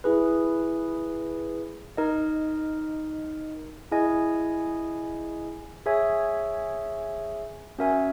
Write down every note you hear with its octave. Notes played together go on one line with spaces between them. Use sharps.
E4 G#4 B4
D#4 A#4 D#5
E4 G#4 D#5 G#5
G#4 C#5 E5 G#5
C#4 F#4 A#4 E5 G#5